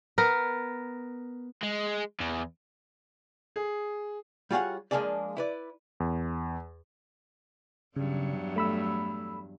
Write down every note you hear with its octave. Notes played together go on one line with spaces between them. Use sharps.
B3 A#4
G#3
E2
G#4
G3 F4 F#4 G#4 C#5 F#5
F3 G#3 A#3 D4 G#4 D5
E4 B4 D5
E2
E2 G2 C#3 F#3
A3 B5 E6